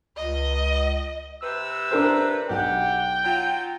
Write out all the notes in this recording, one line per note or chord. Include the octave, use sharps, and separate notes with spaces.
C#2 D#5
C3 B4 E6
D4 A#4 C5
B1 G4 F#5 G5
F#3 F4